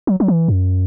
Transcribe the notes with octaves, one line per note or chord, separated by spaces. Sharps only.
F#3
F#3
E3
F#2